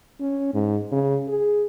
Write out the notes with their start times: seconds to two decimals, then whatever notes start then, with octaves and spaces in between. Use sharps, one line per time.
0.21 C#4
0.54 G#2
0.92 C#3
1.28 G#4